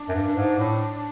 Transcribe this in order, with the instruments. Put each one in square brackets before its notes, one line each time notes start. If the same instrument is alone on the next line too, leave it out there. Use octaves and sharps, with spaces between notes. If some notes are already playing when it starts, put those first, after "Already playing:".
Already playing: [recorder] D4
[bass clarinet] F#2
G2
G2
G#2
A2